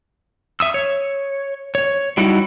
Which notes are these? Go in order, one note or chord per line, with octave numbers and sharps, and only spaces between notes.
E5 D#6 E6
C#5
C#5
F#3 G3 D#4 E4 F#4